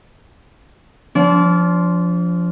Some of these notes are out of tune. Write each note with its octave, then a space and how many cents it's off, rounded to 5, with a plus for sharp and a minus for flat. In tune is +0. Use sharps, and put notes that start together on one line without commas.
F3 +0 D4 -35